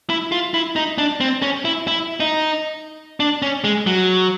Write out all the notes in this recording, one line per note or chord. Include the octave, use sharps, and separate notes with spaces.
E4
F4
E4
D#4
D4
C4
C#4
E4
E4
D#4
D4
C#4
G#3
F#3